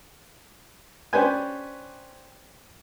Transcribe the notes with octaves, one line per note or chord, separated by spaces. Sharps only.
C#4 D4 G4 B4 C5 G#5